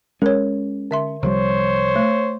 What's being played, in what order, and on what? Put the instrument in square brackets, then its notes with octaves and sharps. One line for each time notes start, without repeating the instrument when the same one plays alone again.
[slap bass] G#3 C#4 [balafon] A#4 C#5
[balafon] D3 E5 C6
[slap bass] C2 F3 G3 [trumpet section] C5 C#5
[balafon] A3